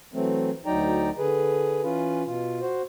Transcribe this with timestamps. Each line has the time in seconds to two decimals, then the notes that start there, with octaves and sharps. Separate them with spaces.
0.14 E3 F#3 A3 C4
0.66 D2 F#3 D#4 D5 G5 A#5
1.18 D3 G#4 B4
1.84 E3 C#4 F4 B4
2.26 B2 F4
2.61 F#4 C5